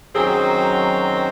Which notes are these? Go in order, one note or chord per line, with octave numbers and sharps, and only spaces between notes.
F#2 D#3 F#3 C4 G#4